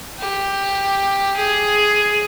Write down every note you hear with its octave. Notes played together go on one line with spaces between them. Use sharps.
G4
G#4